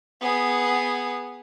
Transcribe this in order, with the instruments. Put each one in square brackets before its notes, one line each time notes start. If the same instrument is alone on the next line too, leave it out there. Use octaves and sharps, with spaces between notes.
[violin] B3 G#4